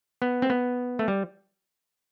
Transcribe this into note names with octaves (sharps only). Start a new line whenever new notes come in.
B3
C4
B3
A3
G3